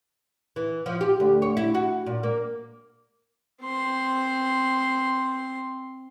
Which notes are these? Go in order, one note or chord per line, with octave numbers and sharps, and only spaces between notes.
E3
F3
G4
D2
C#5
E4
F#4
A#2
A#3
C4 C6